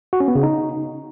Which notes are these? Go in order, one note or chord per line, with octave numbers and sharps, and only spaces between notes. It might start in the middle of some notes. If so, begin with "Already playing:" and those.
F#4
C#4
B3
C#3
D#4